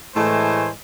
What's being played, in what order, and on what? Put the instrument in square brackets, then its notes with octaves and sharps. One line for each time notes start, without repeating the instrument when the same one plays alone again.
[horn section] A2 E3 G#3 A3 C5 G#5